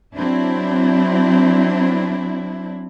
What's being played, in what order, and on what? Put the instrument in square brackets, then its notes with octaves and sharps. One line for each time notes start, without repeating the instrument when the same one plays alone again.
[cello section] F#3 C4 D4 E4